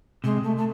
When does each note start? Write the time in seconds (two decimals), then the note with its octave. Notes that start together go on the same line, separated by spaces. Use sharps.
0.24 C3 G#3
0.43 A3
0.57 A3